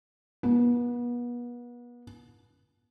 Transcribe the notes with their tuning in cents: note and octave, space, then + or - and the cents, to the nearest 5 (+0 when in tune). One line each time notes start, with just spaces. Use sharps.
B3 -35